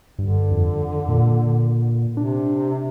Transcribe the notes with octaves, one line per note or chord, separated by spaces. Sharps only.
G2 D3
F2
A#2
C3 D4